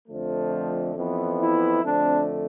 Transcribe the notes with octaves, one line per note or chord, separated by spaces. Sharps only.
F2 D3 F3 A3
F2 E3 B3
E4
F2 D3 A3 C4 D4